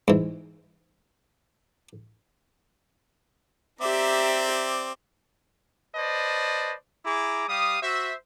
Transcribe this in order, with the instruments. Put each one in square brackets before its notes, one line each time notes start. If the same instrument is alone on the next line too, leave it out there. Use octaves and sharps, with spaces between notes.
[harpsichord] G#2 E3
[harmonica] C4 D5 D6 [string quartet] G4 E5 A#5
[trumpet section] B4 C5 D5 D#5 A5
E4 G#4 A#5 D6
G3 G4 F5 D#6
F#4 C5 E5